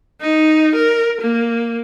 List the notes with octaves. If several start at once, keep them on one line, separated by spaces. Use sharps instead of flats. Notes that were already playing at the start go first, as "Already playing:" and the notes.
D#4
A#4
A#3